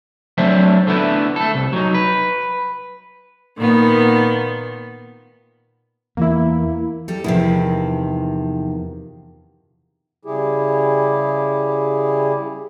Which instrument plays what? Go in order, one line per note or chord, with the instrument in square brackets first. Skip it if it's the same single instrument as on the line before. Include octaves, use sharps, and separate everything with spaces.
[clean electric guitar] F#3 A3 C4 D4 C5 E5
D3 A3 B3 E4
A3 A4
C2
F#3 D#4
B4
[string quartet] A#2 D#3 B3
[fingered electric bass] E2 E3 [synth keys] A#3 E4
[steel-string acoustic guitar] G3 A4
[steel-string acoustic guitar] E2 F3 [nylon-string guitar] C3 D#3 E4
[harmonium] C#3 G3 E4 G4 G#4